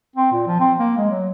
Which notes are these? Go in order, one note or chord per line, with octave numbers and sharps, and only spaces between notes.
C4
A#2
F3
C4
A#3
G#3
F#3